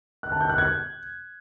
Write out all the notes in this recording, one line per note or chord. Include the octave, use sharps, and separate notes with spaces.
F#6
A5
G6
F#6
G#6